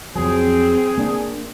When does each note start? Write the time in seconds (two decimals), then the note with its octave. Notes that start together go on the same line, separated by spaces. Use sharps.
0.15 F2 F#3 C4 G#4
0.98 A#3 D4